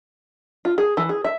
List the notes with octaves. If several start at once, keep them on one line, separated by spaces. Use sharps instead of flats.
F4
G#4
E3
G#4
E5